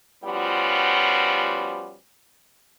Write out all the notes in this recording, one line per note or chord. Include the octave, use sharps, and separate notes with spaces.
F3 G3 B3 C#4 F4 F#4